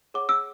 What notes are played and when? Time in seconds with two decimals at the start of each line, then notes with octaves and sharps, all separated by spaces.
0.14 G#4 C#5 F#5 D6
0.29 E6